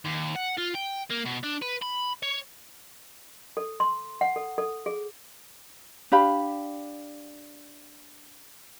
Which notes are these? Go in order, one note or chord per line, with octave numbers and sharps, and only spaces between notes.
D#2
F#5
F4
G5
A#3
B2
D4
B4
B5
C#5
A4
C6
F#5
A4
A4
G#4
D4 G4 F5 B5